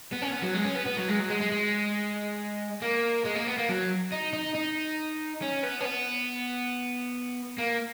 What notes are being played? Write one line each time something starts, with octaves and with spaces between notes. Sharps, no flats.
B3
C#4
B3
F#3
G#3
C#4
B3
B3
F#3
G#3
F#3
G#3
G#3
G#3
A#3
G#3
A#3
B3
A#3
F#3
D#4
D#4
D#4
C#4
B3
C#4
B3
A#3